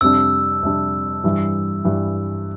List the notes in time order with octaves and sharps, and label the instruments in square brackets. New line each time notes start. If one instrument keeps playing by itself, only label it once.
[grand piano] F2 C3 G3 D4 [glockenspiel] E6
[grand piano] F2 C3 G3 D4
G2 E3 G3
G2 E3 G3